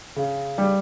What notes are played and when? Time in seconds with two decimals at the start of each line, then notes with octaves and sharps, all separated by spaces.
0.16 C#3
0.58 G3